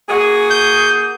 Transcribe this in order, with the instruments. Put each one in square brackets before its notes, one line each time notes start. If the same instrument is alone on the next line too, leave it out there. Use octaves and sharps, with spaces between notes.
[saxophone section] A#3 F#4 G#4
[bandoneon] G6